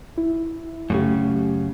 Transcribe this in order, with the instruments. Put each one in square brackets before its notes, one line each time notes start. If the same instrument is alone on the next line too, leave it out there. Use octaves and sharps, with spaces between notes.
[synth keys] E4
[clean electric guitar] F#2 A#2 C#3 [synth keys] A3 G4